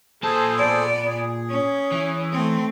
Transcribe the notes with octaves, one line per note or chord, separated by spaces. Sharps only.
A#2 G#4 A4 C5 A5
B3 D5
G#4
C#4
E3
A3 C4